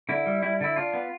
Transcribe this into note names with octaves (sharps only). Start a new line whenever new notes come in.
D3 E4
G3
G3 E4
D3 E4
D4 F4
B3